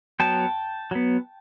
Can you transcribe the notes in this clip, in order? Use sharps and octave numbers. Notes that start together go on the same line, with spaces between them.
F#3 B3 G5 A5
F#3 B3